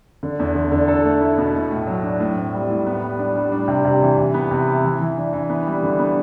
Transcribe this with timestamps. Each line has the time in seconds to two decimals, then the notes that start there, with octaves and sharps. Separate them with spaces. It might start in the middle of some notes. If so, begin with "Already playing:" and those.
0.23 D3
0.39 E2
0.55 D3
0.72 D3
0.88 A4
1.04 A3
1.21 E4
1.38 B2
1.54 A3
1.70 A2
1.87 F#3
2.03 D4
2.20 A2
2.37 C4
2.54 G3
2.70 A2
2.87 B3
3.02 G3
3.19 D4
3.35 G3
3.52 D4
3.68 C3
3.85 C3
4.02 E3
4.17 C3
4.34 B3
4.51 C3
4.68 E4
4.84 E3
5.00 E3
5.17 D4
5.33 E3
5.50 B3
5.66 G3
5.83 D3
5.99 B3